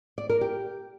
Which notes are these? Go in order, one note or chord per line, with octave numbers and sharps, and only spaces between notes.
D5
A#4
G4